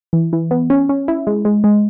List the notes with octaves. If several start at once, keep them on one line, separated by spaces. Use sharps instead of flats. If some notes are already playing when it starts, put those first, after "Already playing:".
E3
E3
B3
C#4
C#4
E4
G#3
G#3
G#3